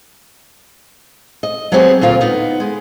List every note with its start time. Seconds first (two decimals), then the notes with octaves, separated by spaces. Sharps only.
1.43 D#5
1.72 F#3 G#3 B3 C4 G4 G#4
2.01 D2 A#2 F4 A#4
2.21 B3 D#4
2.60 G#3